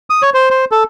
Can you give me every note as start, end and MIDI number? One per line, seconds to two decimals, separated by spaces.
0.10 0.22 87
0.22 0.30 73
0.34 0.49 72
0.50 0.65 72
0.72 0.84 69